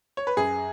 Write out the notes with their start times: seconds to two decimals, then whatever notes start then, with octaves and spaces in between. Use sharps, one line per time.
0.17 C#5
0.27 B4
0.37 F#2 G#4